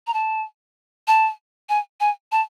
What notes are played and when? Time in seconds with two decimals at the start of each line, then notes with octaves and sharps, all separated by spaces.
0.07 A#5
0.14 A5
1.07 A5
1.69 G#5
2.00 G#5
2.32 A5